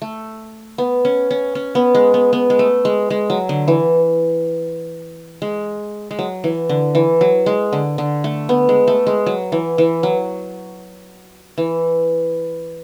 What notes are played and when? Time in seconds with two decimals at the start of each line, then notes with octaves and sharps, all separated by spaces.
0.02 A3
0.78 B3
1.05 C#4
1.31 C#4
1.55 C#4
1.75 B3
1.95 G#3
2.14 B3
2.33 B3
2.50 G#3
2.59 A3
2.85 G#3
3.10 G#3
3.30 F#3
3.49 D3
3.68 E3
5.42 G#3
6.11 G#3
6.19 F#3
6.44 E3
6.69 D3
6.95 E3
7.21 F#3
7.46 G#3
7.73 D3
7.98 D3
8.24 A3
8.49 B3
8.69 G#3
8.88 A3
9.07 G#3
9.26 F#3
9.52 E3
9.78 E3
10.03 F#3
11.58 E3